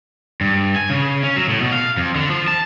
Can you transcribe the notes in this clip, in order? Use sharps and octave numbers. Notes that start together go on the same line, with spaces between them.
G2
G#5
C#3
C#4
F#3
A2
B2
F5
F2
D3
F3
A5